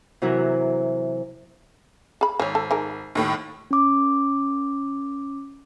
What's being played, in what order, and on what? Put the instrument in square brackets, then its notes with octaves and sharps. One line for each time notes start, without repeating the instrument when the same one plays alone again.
[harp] C3 E3 F#3 E4 F#4 A#4
[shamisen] G#4 B5
[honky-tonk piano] G#1 [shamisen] C5 C#5
[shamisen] A4 A5
D#4 G#4 A#4
[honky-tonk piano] D#2 A2
[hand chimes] C#4 D6